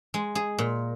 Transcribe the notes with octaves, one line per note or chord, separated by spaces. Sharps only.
G#3
G#4
A#2